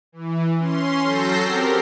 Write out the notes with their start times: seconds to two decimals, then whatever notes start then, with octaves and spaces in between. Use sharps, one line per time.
0.12 E3
0.58 C#4 C6
1.03 F#3 A4 G6 A#6 C7
1.43 C4 G4 A#4